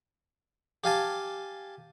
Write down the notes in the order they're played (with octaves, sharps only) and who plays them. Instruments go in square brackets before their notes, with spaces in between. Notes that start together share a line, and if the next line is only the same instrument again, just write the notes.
[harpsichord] G4 F5 G#5 A5